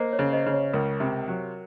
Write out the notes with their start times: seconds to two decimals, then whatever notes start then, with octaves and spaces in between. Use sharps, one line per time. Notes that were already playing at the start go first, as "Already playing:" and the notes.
Already playing: A#3 C5 D#5
0.13 C#5
0.19 C#3
0.33 C5 D#5
0.46 C#3
0.53 C#5
0.73 C#2 A#4
1.00 C3
1.28 F#3